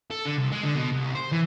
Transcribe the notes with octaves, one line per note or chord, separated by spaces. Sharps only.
A4
D3
C2
G#3
D3
B2
C2
C5
E3